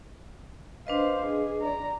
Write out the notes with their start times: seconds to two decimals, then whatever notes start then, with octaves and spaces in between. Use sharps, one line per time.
0.87 D4 B4 C5 D#5 F5
1.26 G#4
1.61 D5 A#5